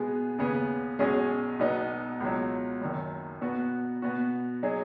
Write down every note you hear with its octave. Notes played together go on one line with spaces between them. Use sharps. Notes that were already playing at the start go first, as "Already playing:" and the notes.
Already playing: B2 G#3 B3 G#4
D#2 C#3 B3 G#4
B1 B2 G#3 C#4 G#4
B1 B2 B3 D#4
C#2 B2 F#3
F#1 F#2 D#3
B2 B3 F#4
B2 B3 F#4
F#3 D#4 G#4